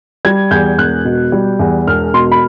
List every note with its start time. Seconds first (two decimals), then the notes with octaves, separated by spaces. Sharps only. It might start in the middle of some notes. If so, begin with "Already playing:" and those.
0.25 G3 G#6
0.51 E2 G6
0.78 E1 F#6
1.05 B2
1.32 G3
1.59 E2
1.87 E1 F6
2.14 B2 C6
2.32 B5